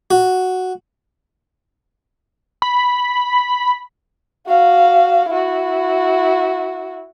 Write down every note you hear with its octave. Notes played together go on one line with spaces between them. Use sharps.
F#4
B5
F#4 F5
E4 F#4